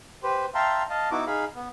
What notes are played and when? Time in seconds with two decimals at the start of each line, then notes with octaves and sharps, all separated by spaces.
0.23 G4 B4 C5
0.55 E5 F5 G5 A5 A#5 C6
0.90 D#5 F5 A5
1.11 B3 D#4 E4 F#4 D6
1.27 D#4 G#4 F5 B5
1.55 B3